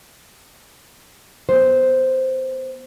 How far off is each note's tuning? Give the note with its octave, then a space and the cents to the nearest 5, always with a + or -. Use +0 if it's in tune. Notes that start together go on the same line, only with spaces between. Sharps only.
B3 +0 C5 +0